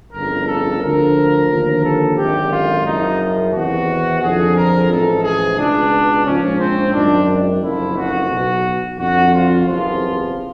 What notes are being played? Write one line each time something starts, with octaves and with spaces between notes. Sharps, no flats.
G1 F2 C#3 A#4
A4
D2 D3 F3 A#4
D#2 D3 F3
A4
G#1 F#2 D3 G4
F4
F#1 F#2 C#3 F3 D#4
E2 C3 D#3 F#4
F2 D3 F3 G#4
A#4
A1 G#2 F3 A4
G#4
C#2 B2 D4
A#1 G#2 F3 C#4
C4
G#1 F#2 D#3 D4
F#1 F2 D3 F3 E4
F#4
B1 B2
F2 D3 F3 F#4
F4
F#1 E2 C3 F3 F4